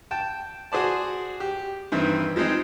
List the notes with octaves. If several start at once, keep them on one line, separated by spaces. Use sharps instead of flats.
G5 A5
F#4 G#4 C5 D5 A5
G4
G2 D#3 E3 C4
F3 G#3 C4 D#4